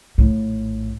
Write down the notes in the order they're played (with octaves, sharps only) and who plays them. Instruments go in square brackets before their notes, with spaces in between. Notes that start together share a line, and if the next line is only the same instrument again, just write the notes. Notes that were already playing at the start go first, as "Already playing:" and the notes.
[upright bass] A#1 A2